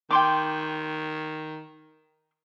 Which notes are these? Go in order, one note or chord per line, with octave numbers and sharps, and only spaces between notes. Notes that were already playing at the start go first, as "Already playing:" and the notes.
D#3 G5 C6 D6